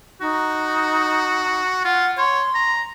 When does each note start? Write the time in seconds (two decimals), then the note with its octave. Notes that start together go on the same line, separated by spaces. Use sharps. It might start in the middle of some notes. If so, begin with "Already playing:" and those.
0.21 D#4 F#4
1.85 F4 F#5
2.18 C#5 C6
2.55 A#5